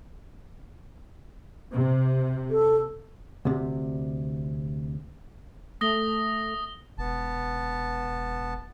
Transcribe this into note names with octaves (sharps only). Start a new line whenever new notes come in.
C3
A4
D2 C3
A3 D#6 A#6 G7
E1 B3 A5